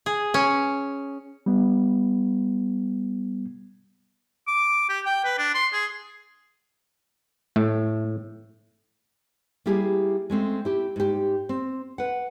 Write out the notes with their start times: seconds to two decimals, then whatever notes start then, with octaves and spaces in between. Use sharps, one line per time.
0.06 G#4
0.34 C#4
1.46 G3 B3
4.47 D6
4.89 G4
5.06 G5
5.25 B4
5.38 D4
5.55 C6
5.73 G#4
7.56 A2 A3
9.66 G3 A#3 E4 G4 G#4
10.30 G#3 A3 C4 C#4
10.65 E4 G4
10.96 G#2 G4
11.49 C4
11.98 B4 F#5